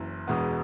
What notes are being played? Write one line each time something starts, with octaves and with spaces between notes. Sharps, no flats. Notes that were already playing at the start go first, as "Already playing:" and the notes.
Already playing: F#1 F#2 E3
E1 E2 B2 G#3 B3